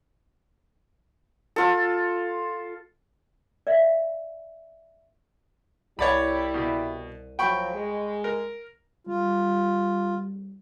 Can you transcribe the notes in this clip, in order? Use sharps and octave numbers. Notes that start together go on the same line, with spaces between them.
F4 A4
D5 E5 F5
C2 G3 E4 C#5 D5 B5
B2
F3 F#3 G5 B5 C#6
G#3
A#4
G3 F4